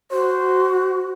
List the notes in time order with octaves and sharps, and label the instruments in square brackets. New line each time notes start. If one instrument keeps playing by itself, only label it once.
[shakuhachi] F#4 [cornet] C5